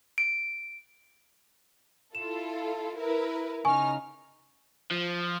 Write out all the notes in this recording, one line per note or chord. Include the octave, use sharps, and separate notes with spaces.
D7
E4 F4 A4 E7
E4 A#4 B4
C#3 D#4 G#5 C#6 F6
F3